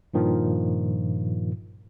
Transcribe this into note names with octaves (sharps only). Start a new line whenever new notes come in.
G2 A#2 D#3 F3